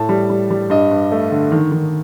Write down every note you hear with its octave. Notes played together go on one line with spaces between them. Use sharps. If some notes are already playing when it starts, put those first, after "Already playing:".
Already playing: A2 A5
G3
G3
G3
G2 D#5
G2
A3
D3
D#3
D#3